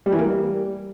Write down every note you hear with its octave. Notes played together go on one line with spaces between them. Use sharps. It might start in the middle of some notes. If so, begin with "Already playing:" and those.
G3
E3
A#3
G3